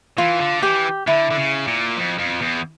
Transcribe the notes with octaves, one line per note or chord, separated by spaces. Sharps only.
E3 F4
D3
E3 G4
D3 E4
D3
C#3
A#2
F2
F2
E2